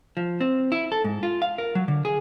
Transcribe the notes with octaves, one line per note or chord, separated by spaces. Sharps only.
F3
C4
E4
A4
G#2
F4
F5
A#4
F#3
D3
G#4